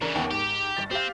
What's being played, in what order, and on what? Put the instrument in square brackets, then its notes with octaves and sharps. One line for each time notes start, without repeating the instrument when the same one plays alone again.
[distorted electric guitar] C#3 E3 [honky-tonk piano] D4 A#4
[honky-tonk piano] D#2 B3 G5
[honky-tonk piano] G#2 [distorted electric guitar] G4
[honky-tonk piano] G1 A6
[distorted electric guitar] C4 [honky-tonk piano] G4 F5